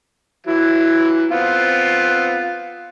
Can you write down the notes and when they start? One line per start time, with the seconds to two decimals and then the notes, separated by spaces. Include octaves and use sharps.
0.47 E3 F#3 E4
1.32 B3 C4 F4